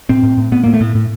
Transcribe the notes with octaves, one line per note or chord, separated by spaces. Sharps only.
A2 C4
A2
A2
A2 B3
A2 A#3
A3
A2
A2